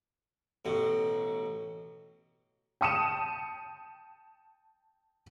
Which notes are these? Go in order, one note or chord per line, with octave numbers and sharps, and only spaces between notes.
A1 B2
G5 A5 D#6 C#7 D#7 E7